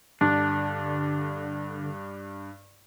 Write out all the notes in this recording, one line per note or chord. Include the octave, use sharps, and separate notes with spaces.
G2 D3 D4